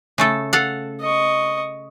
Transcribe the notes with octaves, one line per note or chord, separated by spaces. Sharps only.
C#3 A3 A4
A4 F5 F#5
D#5 C#6